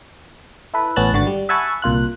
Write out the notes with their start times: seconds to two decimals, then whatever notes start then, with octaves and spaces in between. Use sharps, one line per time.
0.74 E4 A4 B4
0.96 A1 A2 B3 C#4 A5 F#6
1.13 G#1 D3 F#4 A6
1.27 G3
1.49 E5 F#5 G#5 A5 B5 C#6
1.82 C2 A#2 F4 F#6